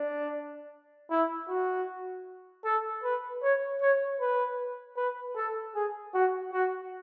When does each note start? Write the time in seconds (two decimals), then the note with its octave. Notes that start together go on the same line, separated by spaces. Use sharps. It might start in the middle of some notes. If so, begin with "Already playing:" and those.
Already playing: D4
1.11 E4
1.49 F#4
2.65 A4
3.04 B4
3.43 C#5
3.81 C#5
4.20 B4
4.97 B4
5.36 A4
5.75 G#4
6.14 F#4
6.53 F#4